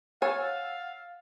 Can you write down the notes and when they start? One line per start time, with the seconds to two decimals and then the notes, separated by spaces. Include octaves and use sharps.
0.22 C#5 F5 F#5 G#5 E6 A6